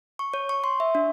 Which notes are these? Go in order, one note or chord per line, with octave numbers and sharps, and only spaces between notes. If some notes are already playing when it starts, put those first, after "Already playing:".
C#6
C#5
C#6
C6
E5
D4